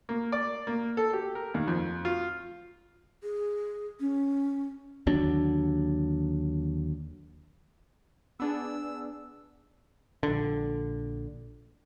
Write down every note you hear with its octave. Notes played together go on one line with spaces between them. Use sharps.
A#3
D5
A#3
A4
G4
A#4
D#2
F2
F4
G#4
C#4
D#2 D3 F#3 D4
B3 D4 G#4 E6
A#1 D3